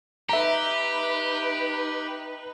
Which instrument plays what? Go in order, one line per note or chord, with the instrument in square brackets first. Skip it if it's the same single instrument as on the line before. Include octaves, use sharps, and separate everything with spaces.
[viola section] D#4 B4 [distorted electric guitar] G4 [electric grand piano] E5 A#5